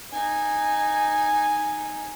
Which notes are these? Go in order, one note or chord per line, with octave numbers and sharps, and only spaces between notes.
D#4 G#5